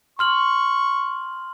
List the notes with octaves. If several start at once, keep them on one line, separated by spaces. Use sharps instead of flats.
C6 C#6 F6 F#7